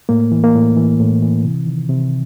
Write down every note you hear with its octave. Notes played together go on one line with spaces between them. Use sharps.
A2 A#3
E3
A#3
A2
E3
A2
E3
C3
D#3
C3